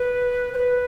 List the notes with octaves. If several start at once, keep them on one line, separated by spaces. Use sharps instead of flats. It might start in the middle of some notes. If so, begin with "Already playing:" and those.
Already playing: B4
C5
B4